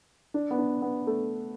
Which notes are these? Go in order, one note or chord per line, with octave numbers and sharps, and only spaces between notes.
D4
B3
D4
B3
A3